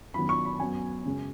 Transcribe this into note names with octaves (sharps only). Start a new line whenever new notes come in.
F#2 D#3 F#3 B3 B5
C#6
B5
F#2 F#3 B3 G#5
F#2 C#3 G#3